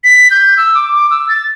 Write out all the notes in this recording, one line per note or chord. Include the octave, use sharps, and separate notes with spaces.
B6
G6
E6
D6
D6
E6
A6